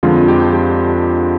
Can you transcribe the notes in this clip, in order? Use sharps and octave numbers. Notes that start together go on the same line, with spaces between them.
F2 D3 G#3 F4
G4
G4